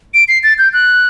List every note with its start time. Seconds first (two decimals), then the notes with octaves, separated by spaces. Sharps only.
0.14 D7
0.28 C7
0.43 A6
0.58 G6
0.73 F#6